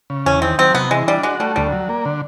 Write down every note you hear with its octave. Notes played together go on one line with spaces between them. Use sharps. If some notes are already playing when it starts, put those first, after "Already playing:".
C#3
E2 C#4
D#3 C4
F#3 C4
C3 B3
E3 G#3
G3 D4
G#3 F#4
G3 A3
D2 G3
F#3
A#3
D3